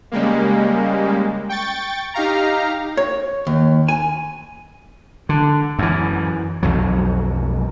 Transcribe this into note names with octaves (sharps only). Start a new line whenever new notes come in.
C#3 G3 G#3 A#3
G5 C#6 A6
D#4 G4 F5 A#5
C#5
D#2
G#5
D3
F#2 E3
B1 F2 F#3